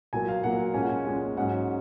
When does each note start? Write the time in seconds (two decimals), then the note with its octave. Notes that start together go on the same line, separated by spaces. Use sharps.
0.13 A#2 F#3 A#3 G#5
0.28 F5
0.43 A#2 F#3 A#3 F#5
0.74 A#2 G#3 C#4 G#5
0.82 F#5
0.89 G#5
1.06 A#2 G#3 C#4
1.37 G#2 F#3 C#4 F#5